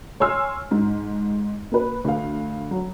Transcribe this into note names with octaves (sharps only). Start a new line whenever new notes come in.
C#5 G#5 C6 E6 F6
G#2
A#3 B4
D2 F5
F#3